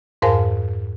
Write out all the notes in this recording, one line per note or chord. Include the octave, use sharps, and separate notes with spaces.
F2 G#2 A#4 C5 F5 G#5